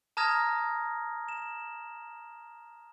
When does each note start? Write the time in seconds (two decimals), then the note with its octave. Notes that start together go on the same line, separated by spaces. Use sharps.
0.17 A5 A#5 D#6 F6 G#6 A#6
1.28 E7